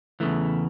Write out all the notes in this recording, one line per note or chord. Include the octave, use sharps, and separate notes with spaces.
E2 C#3 E3 A3